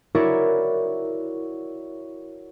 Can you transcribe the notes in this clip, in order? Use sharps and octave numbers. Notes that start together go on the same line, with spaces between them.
E4 F#4 A#4 C#5 D5 E5